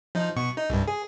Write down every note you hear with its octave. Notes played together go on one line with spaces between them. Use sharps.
F3 D#4
B2 C#6
D#4
C2 G2
G#4